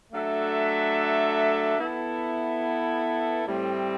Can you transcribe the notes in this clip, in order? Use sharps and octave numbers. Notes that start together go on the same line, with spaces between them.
F#3 A3 D4 A4 E5
B3 E4 A4
A2 G3 C4